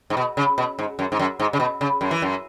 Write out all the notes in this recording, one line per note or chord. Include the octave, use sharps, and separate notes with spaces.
G#2
B2
C#3
B2
G#2
F#2
G#2
F#2
G#2
C#3
B2
C#3
F#2
E3
F#2